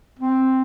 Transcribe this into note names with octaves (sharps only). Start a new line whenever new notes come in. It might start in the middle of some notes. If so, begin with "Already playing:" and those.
C4